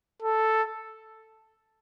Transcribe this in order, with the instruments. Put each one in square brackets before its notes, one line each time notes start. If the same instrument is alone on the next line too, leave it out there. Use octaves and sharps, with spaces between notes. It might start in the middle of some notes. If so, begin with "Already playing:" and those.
[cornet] A4